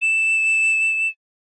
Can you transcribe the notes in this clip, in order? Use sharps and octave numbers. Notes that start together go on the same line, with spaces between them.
E7